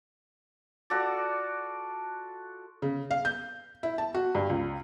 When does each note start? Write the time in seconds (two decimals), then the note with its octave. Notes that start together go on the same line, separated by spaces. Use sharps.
0.90 F4 F#4 A4 D5
2.82 C#3
3.11 F5
3.25 G6
3.83 E4
3.98 A5
4.14 F#4
4.35 G2
4.50 C#2